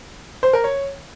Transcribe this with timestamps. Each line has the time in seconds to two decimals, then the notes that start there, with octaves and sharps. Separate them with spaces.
0.43 C5
0.53 A#4
0.64 C#5